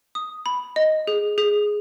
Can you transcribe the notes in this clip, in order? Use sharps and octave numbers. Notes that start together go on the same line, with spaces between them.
D#6
B5
D#5
G#4
G#4